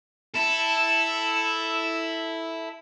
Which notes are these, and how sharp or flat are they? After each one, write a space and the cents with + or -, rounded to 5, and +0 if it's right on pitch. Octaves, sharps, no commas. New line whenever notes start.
E4 -5 A4 +0